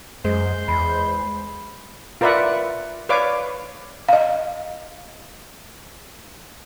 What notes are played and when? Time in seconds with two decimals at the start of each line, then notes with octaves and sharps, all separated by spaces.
0.24 F#2 G#3 C5
0.68 E2 B5
2.21 F4 A#4 B4 D5 E5 F#5
3.09 B4 C#5 D5 F5 D6
4.08 D#5 F5